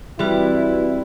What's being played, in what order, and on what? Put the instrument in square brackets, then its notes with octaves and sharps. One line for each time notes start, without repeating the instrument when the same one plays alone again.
[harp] G3 [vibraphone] C4 F#4 B4 [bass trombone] E4